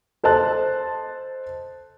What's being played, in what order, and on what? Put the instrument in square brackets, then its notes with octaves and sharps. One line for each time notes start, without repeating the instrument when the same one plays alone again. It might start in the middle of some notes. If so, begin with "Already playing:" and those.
[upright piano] A4 C5 D#5 A5 F#6